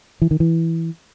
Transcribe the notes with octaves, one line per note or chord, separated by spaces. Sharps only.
E3
D#3
E3